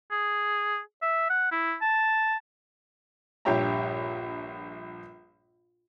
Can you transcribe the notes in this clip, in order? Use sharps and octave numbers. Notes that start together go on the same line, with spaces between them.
G#4
E5
F#5
E4
A5
A#1 G2 G4 C#5 E5 A#5